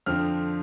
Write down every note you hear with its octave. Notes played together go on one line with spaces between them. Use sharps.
F2 D3 F3 C4 F6